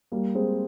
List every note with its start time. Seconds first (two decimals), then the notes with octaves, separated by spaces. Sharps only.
0.12 G3 A#3
0.35 G#3 C4